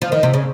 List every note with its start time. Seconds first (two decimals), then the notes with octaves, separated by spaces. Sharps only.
0.02 F3
0.12 D#3
0.23 C3
0.34 C#3